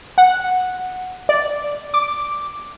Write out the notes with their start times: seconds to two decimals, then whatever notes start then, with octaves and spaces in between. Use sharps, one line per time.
0.18 F#5
1.29 D5
1.94 D6